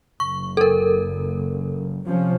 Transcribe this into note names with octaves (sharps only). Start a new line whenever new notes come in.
F#1 C#6
A4 A#4
C3 F3 C#4